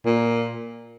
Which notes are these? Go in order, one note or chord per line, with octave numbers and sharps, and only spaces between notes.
A#2